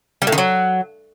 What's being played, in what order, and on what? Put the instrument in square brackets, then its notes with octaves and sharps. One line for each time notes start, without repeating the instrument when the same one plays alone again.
[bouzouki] G3
A2
D#3
F#3